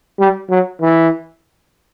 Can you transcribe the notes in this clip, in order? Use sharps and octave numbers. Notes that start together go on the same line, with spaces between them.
G3
F#3
E3